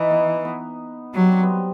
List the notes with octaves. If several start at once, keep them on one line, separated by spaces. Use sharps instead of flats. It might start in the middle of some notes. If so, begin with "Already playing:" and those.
Already playing: E3 D#4
B3
B3
F#3 G3
C4
B3
C4